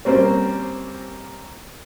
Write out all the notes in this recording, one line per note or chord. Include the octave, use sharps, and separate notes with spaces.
G3 A#3 C4 C#4 C5